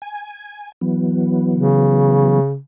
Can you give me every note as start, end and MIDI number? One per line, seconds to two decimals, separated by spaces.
0.02 0.72 80
0.81 2.40 52
0.81 2.40 54
0.81 2.40 59
1.55 2.58 49